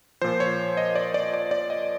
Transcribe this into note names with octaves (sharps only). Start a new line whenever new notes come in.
A#2 F3 C5
C#5
D#5
D5
D5
D5
D5
D#5